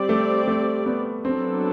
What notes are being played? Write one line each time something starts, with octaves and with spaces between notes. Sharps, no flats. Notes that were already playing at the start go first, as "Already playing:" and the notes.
Already playing: G3 C4 G4 D5
A3
A3
B3
F#3 B3 C4 D4 A4